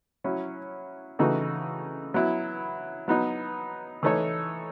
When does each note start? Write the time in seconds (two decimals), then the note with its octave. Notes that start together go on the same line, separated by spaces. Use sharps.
0.24 F#3 C#4 E4
1.19 C#3 E3 A3 D#4 F#4
2.14 F#3 B3 E4
3.08 F#3 B3 D#4
4.03 E3 A3 D#4 A4 C#5